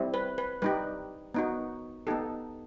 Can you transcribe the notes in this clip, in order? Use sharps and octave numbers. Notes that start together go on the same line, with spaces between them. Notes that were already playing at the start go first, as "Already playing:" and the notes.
Already playing: G3 C4 E4
B4
B4
G3 D#4 G4 B4
B3 D#4 F#4
B3 D#4 G4 A4